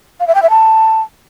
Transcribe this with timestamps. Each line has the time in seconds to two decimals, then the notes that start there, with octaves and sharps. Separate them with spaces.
0.20 F5
0.27 E5
0.35 G5
0.42 E5
0.50 A5